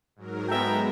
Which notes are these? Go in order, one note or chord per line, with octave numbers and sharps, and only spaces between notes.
G#2 F#3 A#4
G#3 B3 A4 E5 G5 A#5